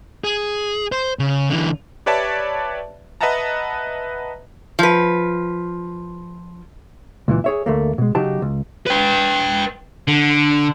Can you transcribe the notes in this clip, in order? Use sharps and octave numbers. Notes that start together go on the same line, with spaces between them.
G#4
C5
C#3
D3 E3
G4 B4 C#5 D5 E5 A5
B4 D#5 E5 F#5 A5 A#5
F3 B4
C#2 A#2 E3
G#4 C#5 E5
D2 A3 A#3
B2 G#3
C#3 F#3 D#4 G4 A5
C#2
B4 G5
D3